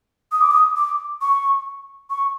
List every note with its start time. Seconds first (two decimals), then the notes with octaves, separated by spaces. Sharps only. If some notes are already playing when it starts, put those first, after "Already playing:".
0.32 D#6
0.41 D6
0.51 D#6
0.76 D6
1.21 C#6
2.10 C#6